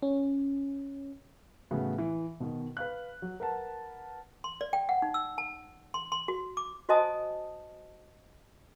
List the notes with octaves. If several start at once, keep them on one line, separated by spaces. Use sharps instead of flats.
C#4
A2 C#3 E3 B3 F#4
E3
B2 D#3
B4 F5 F#6
F#3
A#4 B4 F#5 A5
C6
D5
G5
F#5
D#4
E6
A5
C6
C6
F#4
D6
F#4 C5 D#5 G#5 A5 D#6